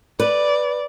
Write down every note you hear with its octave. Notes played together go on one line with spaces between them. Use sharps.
B4 D5